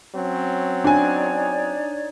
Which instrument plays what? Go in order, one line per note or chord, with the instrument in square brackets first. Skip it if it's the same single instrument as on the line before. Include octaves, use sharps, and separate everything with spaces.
[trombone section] F#3 C4 C#4
[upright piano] D4 G#5 [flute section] D#4 C#5 D5